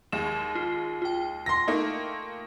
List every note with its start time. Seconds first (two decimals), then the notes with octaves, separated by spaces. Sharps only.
0.12 D#2 G#3 E7
0.55 F4
1.02 F4 G5
1.46 C6 A#6
1.68 A3 A#3 D#4